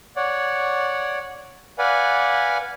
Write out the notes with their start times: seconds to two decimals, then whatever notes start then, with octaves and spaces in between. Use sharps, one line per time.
0.16 C#5 D5 F#5
1.78 B4 D5 F5 F#5 G#5